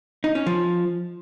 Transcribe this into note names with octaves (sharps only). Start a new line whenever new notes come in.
D#4
C#4
F3